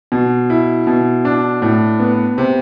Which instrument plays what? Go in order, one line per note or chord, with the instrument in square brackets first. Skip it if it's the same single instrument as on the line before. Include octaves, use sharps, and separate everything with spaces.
[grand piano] B2
E4
B2
D4
A2
B3
C3